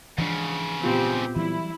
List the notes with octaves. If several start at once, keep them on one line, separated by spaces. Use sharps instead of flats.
G#2 C#3 E3 F3 D4
A#2 B3 C4 F4 G4
E3 F#3 G3 E4